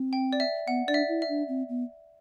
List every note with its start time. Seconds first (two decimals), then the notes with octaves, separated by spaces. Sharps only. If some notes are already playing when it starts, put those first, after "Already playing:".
Already playing: C4
0.13 G5
0.33 D5
0.40 E5
0.68 B3 F#5
0.88 D4 D5
0.94 E5
1.09 E4
1.22 E5
1.29 D4
1.48 C4
1.69 B3